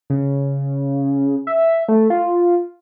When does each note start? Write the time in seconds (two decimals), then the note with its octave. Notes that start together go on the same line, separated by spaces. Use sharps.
0.10 C#3
1.47 E5
1.88 A3
2.10 F4